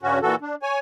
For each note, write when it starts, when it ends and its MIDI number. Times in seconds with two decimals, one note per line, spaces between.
0.02 0.19 43
0.02 0.19 49
0.02 0.19 61
0.02 0.19 66
0.22 0.35 46
0.22 0.35 52
0.22 0.35 66
0.22 0.35 69
0.41 0.55 62
0.62 0.80 73
0.62 0.80 80